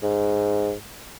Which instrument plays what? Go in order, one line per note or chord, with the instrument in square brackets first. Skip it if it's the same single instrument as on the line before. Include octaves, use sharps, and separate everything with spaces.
[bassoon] G#2